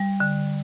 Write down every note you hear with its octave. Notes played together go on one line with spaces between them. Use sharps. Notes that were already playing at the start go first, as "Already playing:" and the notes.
Already playing: G3
D3